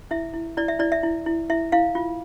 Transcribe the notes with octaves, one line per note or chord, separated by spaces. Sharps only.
E4 E5
E4
E4 D5
E5
E4 D5
E5
E4
E4
E4 E5
E4 F5
F4